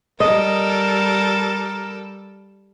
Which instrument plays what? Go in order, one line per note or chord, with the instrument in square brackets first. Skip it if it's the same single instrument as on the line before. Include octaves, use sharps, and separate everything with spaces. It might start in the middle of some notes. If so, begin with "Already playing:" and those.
[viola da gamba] G3 A4 [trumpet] A#4 [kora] D#5